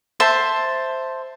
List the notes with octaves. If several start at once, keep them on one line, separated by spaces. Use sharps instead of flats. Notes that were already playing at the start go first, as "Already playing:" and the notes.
C5 E5 A5